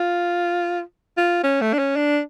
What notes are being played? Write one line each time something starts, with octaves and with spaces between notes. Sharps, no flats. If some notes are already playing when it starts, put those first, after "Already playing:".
Already playing: F4
F4
C#4
A3
D4
C#4
D4